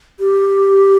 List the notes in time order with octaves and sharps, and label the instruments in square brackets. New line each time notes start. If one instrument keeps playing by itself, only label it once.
[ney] G4